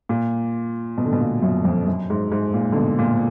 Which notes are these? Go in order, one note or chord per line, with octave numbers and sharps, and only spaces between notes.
A#2
B2
D3
B2
A#2
F#2
F2
F#2
G#2
G#2
A#2
D3
B2
A#2